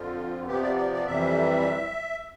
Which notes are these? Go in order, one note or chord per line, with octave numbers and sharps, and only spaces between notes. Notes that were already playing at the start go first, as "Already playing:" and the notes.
Already playing: F2 D3 F3 F4
C3 F3 B3 G4
D5
D5
D5
F2 C3 E3 G3 E5